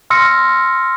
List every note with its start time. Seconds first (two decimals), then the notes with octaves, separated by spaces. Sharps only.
0.10 C6 E6 F6 A#6 C#7